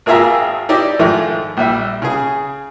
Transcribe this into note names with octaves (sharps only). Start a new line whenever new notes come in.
G#1 A#3 F4 G#4 E5 A#5
D#4 E4 G4 D5 E5
G#2 D#3 F3 G#3 A3
A#1 G3 E5
C#3 G#4